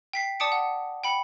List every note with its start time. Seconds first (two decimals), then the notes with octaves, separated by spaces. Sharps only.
0.13 G5 B6 C7
0.40 D5 A5 D6 D#6 C#7 D7
0.52 F#5
1.04 G5 B5 C#7